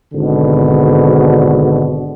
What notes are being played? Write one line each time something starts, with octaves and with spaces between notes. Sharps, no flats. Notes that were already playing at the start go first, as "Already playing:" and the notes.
G#1 B2 D3